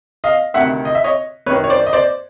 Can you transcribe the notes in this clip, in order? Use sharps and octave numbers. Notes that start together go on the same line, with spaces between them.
D#5 F5
D2 C3 D#3 E5 F#5
D#5
E5
C#5 D#5
F#2 D#3 B4 C#5
C#5
C5 D5
D#5
C5 D5